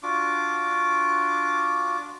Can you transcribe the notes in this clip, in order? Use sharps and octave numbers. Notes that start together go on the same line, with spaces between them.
D4 F4 F#4 D6